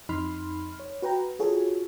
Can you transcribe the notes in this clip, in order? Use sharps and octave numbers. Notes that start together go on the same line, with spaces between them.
F2 D#4 B5 C6 F6
C#5
F#4 B4 G5 A#5
F4 F#4 G#4 A4 C#5